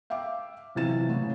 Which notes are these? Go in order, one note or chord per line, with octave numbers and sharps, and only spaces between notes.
E5 F5 G5 D6
B1 C3 E3 A6 E7
A1 C#3